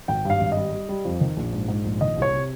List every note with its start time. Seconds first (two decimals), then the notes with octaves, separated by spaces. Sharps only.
0.08 G#1 G5
0.25 G2 F5
0.41 G#1
0.52 G3 D#5
0.73 G3
0.89 G3
1.05 F2
1.21 D#3
1.37 A#1
1.53 G#2
1.68 G#2
1.85 A#1
2.01 D#3 D#5
2.16 C2
2.22 C#5
2.33 C3